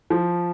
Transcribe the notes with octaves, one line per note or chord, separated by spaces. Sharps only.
F3